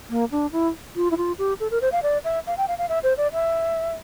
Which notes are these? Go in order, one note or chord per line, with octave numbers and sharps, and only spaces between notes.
A#3
D4
E4
F4
E4
F4
G4
A4
A#4
C5
F5
D5
E5
F5
G5
F5
F5
E5
C5
D5
E5